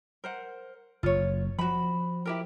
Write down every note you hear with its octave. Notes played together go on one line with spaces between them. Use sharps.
A#4 C5 F#5
F#1 F4 C#5
F3 F#4 B5
E4 G4 A#4